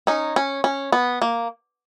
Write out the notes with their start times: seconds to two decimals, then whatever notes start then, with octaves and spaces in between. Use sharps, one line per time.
0.07 C#4 D#4
0.36 C#4
0.64 C#4
0.92 B3
1.22 A#3